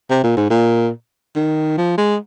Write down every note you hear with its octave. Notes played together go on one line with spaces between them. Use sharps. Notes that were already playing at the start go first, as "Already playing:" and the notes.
C3
A#2
G#2
A#2
D#3
F3
G#3